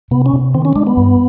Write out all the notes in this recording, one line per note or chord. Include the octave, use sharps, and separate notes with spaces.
C3 B3
C#4
C3
D#3 C4
C#4
G#3 D4
B3
G2